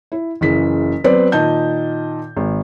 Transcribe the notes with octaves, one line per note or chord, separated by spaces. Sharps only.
E4
F#1 C#3 E3 B6
F#3 B3 C4 B4 D5
A#2 D#3 D#5 A5 G6
G#1